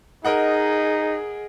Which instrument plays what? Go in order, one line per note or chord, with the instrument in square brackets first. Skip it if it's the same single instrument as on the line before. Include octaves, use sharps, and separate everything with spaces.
[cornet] D#4 [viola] G#4 [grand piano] A#4 D#5 F#5